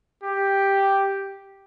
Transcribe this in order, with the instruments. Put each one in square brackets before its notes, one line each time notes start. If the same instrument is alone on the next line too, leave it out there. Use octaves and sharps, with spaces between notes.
[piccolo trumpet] G4